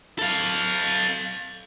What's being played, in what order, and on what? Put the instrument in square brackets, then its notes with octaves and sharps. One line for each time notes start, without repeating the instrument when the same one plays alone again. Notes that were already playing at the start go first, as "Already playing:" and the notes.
[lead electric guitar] A4 F5